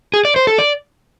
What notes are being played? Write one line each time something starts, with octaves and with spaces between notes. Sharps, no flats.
G#4
D5
C5
A4
D5